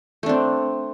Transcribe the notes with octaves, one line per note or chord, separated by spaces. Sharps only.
A3 C4 D4